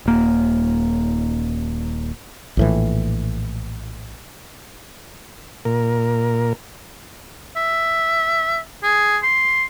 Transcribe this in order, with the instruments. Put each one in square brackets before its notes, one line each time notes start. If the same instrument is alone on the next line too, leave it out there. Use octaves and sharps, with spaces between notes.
[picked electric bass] D#1 A#3
[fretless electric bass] A#1 A2 E3
[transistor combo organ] A#2 A#4
[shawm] E5
G#4
C6